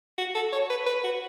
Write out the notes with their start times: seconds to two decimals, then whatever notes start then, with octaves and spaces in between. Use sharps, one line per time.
0.18 F#4
0.35 A4
0.52 C#5
0.70 B4
0.86 B4
1.04 F#4